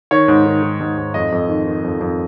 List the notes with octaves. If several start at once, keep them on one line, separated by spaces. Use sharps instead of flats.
D#3 C#5
G#2
D#3
D#3
G#2
G#2
F2 D#5
F2
D#3
D#3
F2
F2